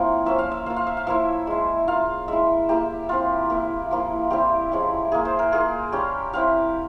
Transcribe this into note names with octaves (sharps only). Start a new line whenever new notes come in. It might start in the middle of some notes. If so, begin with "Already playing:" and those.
Already playing: F3 A#3 C4 E4
F3 A#3 C#4 E5
F5
E5
A#3 F4 F5
F5
E5
F5
F3 A#3 E4 E5
G#3 E4
A#3 F4 F5
G#3 E4 E5
A#3 E4 G4
F3 C4 E4 F4
A#3 E4
F3 A#3 E4
G3 C4 E4 G4
F3 G#3 C#4 E4
A#3 E4 G#4
C5
A#4
A#3 F4 G#4
G3 C#4 F4 G4
G3 C4 E4 F5